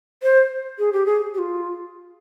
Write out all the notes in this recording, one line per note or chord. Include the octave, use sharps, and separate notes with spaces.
C5
G#4
G4
G#4
G4
F4